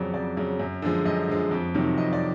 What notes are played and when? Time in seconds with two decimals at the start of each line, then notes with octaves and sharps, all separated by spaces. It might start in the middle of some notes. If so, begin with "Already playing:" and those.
Already playing: F2 C#3 F#3 D5
0.14 F2 D5
0.37 C#3 F#3
0.59 F#2
0.82 D3 F3 G#3
1.06 F#2 D#5
1.28 D3 F3 G#3
1.51 F2
1.74 C3 D#3 F#3
1.98 F2 D#5
2.13 D5